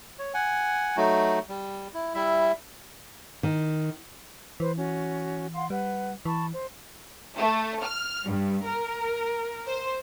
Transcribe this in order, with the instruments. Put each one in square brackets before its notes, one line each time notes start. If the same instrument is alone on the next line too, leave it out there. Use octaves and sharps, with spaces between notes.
[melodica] C#5
F#5 G#5
F#3 A3 D#4 F#4
G3
E4
G3 E4 E5
[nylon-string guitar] D#3
[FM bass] E3 [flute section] B4 C5
[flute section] C#4 F#4
F5 F#5 C6
[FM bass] G3 [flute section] B4 F#5
[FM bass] E3 [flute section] A5 B5 C#6
[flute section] C5
[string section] A3
F6
G2
A#4
C5